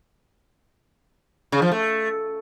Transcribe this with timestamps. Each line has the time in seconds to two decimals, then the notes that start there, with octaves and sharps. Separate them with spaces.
1.52 C#3
1.62 F3
1.72 A3